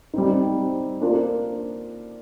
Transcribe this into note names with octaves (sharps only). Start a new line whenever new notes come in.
G3 C4 D#4
A#3 D4 F4 C5